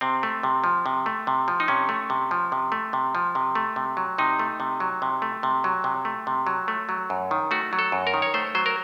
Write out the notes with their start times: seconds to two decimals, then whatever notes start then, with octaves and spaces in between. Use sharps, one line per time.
0.01 C3 C4
0.23 A3
0.43 C3
0.64 F3
0.86 C3
1.06 A3
1.27 C3
1.48 F3
1.60 D#4
1.68 C3 C#4
1.89 A3
2.10 C3
2.31 F3
2.52 C3
2.72 A3
2.93 C3
3.15 F3
3.35 C3
3.55 A3
3.76 C3
3.97 F#3
4.18 C3 D#4
4.39 A3
4.60 C3
4.80 F#3
5.02 C3
5.22 A3
5.43 C3
5.64 F#3
5.84 C3
6.05 A3
6.27 C3
6.47 F#3
6.68 A3
6.89 F#3
7.10 F#2
7.31 D#3
7.51 A3 F#4
7.73 F#3
7.79 A4
7.92 F#2
8.07 A#4
8.14 D#3
8.22 C#5
8.34 A3 C5
8.55 F#3 C5
8.66 A#4